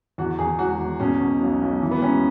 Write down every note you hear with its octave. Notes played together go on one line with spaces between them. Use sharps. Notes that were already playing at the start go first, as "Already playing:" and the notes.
E2 F#4
E2 G#4
E1 F#4
E2
B2 C#4
B2
B1
B1
E3
B3
E1 C#4